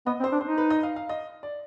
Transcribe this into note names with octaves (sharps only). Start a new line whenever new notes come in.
B3 D#5
C4
C5
D4
D#4 C5
B4
D#5
F5
F5
D#5
D5